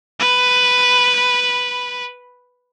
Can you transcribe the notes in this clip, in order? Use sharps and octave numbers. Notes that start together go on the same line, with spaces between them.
B4 B5